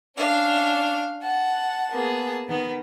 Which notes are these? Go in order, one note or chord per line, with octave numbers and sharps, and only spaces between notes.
C#4 D4 F5
F#5 A5
A#3 B3 G#4
D#3 B3